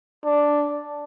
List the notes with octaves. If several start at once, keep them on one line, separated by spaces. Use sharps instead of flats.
D4